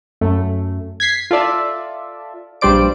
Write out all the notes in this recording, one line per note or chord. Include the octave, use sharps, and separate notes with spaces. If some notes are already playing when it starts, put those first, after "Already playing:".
F#2 A3
G#6 B6 C7
F4 A4 D5 E5
A#1 G2 G3 C5 D5 D7